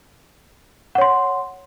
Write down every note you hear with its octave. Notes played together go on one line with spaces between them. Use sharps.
C#5 F#5 C6